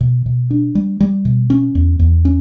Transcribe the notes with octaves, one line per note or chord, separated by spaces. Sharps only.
B2
B2
D4
G3
G3
B2
C#4
E2
E2
C#4